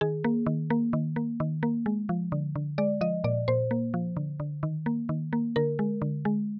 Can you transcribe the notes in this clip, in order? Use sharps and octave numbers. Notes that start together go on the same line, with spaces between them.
D#3 G#4
A#3
D#3
A#3
D#3
A#3
D#3
A#3
G#3
F3
D3
D3
G#3 D5
F3 D#5
A#2 D5
A#2 C5
A#3
F3
D3
D3
D#3
A#3
D#3
A#3
D3 A#4
G#3
D3
G#3